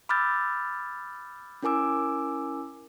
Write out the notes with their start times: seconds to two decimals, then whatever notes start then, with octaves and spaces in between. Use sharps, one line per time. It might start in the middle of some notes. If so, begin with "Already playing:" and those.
0.09 B5 D6 E6 F6 G6 A6
1.63 C#4 E4 A#4 G#5 D6 E6